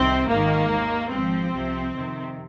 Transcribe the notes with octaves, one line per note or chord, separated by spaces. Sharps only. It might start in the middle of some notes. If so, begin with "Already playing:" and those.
Already playing: C2 C3 D#3 C4
G#1 G#2 D#3 A#3
D#2 D#3
G#1 G#2 F3 C4
C2 C3 F3
F2 C3 D#3